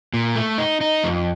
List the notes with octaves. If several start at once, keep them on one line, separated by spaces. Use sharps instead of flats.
A#2
A3
D#4
D#4
F2